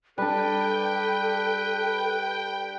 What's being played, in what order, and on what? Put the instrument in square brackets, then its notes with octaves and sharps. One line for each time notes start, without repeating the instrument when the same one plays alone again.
[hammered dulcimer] G3 D4 [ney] A4 [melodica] B4 [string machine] G5